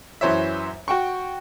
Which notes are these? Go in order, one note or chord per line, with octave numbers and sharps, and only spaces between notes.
F#2 E3 C5 C#5 E5
F#4 G5 C#6